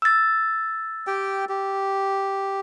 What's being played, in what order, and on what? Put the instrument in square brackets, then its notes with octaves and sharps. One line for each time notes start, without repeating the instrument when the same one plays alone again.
[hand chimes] E6 A6
[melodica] G4 G5
G4